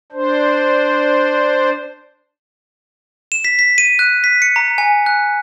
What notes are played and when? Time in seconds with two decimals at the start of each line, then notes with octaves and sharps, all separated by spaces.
0.12 D4 C5
3.32 E7
3.45 B6
3.59 B6
3.78 D#7
3.99 F#6
4.24 B6
4.42 C#7
4.56 A#5
4.78 G#5
5.06 F#6